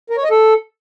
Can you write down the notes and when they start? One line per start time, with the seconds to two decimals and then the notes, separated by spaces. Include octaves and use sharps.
0.10 A#4
0.17 C#5
0.24 D#5
0.31 A4